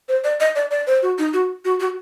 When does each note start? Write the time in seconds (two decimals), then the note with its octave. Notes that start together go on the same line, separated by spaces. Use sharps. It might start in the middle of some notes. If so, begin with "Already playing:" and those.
0.09 C5
0.24 D5
0.40 D#5
0.56 D5
0.71 D5
0.87 C5
1.02 F#4
1.18 D#4
1.33 F#4
1.65 F#4
1.80 F#4